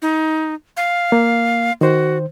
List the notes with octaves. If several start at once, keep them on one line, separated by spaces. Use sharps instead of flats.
D#4
F5
A#3
D#3 F#4 C5